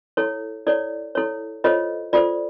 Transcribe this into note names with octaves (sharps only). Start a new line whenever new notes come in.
E4 A4 C#5
E4 A4 C#5 D5
E4 A4 C#5
F4 A4 C5 C#5 D#5
F4 A4 C5 D5